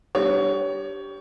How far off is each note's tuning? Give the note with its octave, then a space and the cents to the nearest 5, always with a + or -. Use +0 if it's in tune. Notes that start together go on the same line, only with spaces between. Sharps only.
G3 +0 D4 +0 C#5 +20